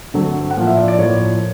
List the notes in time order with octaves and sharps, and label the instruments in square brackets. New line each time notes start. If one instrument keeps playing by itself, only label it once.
[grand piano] G2 D3 F#3 A3 C4
F#5
A2 F3 A#3 F5
E5
D5
D5
A2 F3 A#3 C#5